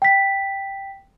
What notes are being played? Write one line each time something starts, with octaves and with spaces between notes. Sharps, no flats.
G5 B6